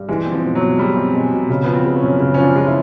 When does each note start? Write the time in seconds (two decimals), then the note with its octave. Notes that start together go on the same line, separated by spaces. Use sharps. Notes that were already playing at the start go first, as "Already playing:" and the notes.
Already playing: G2
0.09 E3 G#3
0.26 C4
0.32 F3
0.43 B2
0.55 F#3
0.61 B2
0.79 G3 G#3
0.96 C4
1.14 B2 G#3
1.32 B2
1.49 C#3
1.64 F3 B3
1.73 C4
1.85 G#3
1.96 C#4
2.03 F#2
2.20 C#3
2.34 F3 C#4
2.43 D4
2.56 G#3 F4
2.67 E4